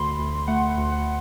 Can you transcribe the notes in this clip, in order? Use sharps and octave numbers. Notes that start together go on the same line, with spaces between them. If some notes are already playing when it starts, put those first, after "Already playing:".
Already playing: D2 D3 B5 C6
D2
A3 F#5
F#5
D2
F#5